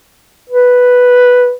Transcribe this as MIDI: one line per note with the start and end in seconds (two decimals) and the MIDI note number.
0.50 1.54 71